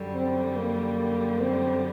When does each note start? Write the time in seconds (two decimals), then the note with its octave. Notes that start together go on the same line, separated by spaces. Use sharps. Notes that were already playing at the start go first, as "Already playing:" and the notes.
Already playing: F#2 D3 G3
0.15 C4
0.56 A#3
1.40 C4